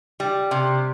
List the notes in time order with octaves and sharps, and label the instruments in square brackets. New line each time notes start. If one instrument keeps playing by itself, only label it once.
[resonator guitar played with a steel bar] G3
C3